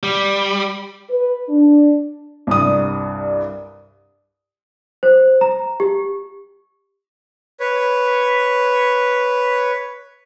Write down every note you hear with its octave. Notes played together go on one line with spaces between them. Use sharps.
G3
B4
D4
C2 G2 D#6
C5
A#5
G4
B4 C#5